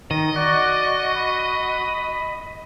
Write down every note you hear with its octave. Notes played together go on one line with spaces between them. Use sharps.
D#3 D#5
F#4 D5
B5